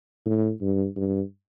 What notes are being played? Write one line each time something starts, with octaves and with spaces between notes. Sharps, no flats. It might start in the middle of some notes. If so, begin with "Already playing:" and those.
A2
G2
G2